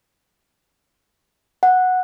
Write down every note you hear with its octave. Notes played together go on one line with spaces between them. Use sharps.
F#5